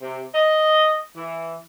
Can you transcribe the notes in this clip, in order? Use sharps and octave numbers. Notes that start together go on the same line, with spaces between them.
C3
D#5
E3